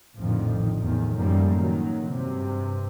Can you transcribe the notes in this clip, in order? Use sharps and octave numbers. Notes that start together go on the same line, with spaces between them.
A#1 F2 A2 D3 D#3 F3
E2 A2 D#3
F#2 A2 D#3 F3 G3 A#3
D#3 F#3
G2 C3